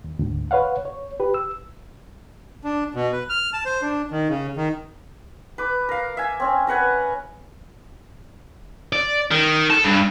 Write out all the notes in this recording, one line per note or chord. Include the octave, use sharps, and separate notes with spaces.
D#2
D2 G#2
B4 C#5 F5 F#5
C#5
G4 B4
E6
D4
B2
B4
F6
A5
C5
D4
D#3
C#3
D#3
B4 D6
A#4 F5
E5 G#5
C4 C#4
A#4 B4 F#5 G#5
D5
D#3
A4
G2